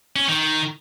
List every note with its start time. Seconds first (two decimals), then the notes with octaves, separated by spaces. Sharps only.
0.16 C#4
0.29 D#3